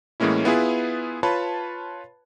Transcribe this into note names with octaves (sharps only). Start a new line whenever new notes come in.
A2 E3 G#3 A#3 C#4 E4
B3 E4 F4 G#4 B4
F4 B4 C#5 A5 B5